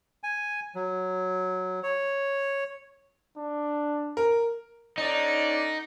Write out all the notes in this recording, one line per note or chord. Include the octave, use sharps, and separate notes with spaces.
G#5
F#3
C#5
D4
A#4
D3 C#4 D#4 D5